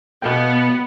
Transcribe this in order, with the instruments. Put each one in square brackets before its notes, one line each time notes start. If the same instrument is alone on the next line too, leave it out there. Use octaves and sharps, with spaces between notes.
[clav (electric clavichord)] B2 F5 G5 [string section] B3